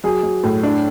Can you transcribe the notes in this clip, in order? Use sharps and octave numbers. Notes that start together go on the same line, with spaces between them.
F#3 G#4
F#3
A2
D4